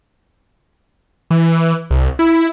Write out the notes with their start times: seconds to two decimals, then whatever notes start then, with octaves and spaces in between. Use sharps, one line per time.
1.31 E3
1.90 C2
2.19 E4